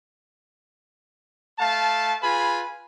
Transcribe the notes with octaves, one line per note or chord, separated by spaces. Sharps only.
A3 F5 A5
F4 G#4 B4 G#5 B5